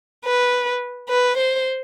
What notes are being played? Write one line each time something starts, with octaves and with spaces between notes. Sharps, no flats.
B4
B4
C5